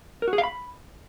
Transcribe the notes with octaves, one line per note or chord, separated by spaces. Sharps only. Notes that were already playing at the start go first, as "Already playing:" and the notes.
A#4
F#4
G#4
F5
B5